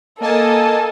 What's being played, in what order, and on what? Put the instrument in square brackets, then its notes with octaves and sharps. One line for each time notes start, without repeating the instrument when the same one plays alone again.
[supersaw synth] A#3 G#5 A5 [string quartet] A4 D#5